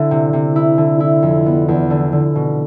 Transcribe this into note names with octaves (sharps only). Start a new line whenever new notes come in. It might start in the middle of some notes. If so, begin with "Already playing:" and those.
Already playing: D3 E4
C3
C3
E4
D3
E4
F2
B3
E2
D3
D3
B2